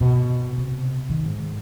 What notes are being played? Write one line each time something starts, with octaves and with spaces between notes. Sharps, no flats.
B2
C3
D#3
G#2